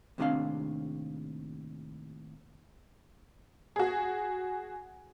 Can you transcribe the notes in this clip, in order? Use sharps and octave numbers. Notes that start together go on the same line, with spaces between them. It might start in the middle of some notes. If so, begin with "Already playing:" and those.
D#2 A2 C3 E3 D4 F5
F#4 G#4